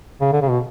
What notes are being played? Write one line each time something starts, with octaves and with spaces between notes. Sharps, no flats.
C#3
D3
C#3
B2